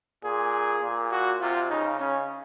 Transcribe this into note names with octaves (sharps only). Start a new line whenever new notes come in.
A#2 G#4
A#2
F#4
C3 F4
C#3 D#4
C#3 C#4